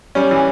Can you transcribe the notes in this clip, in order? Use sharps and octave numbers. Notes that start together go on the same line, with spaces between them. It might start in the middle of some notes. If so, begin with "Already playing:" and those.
G3 C#4
E3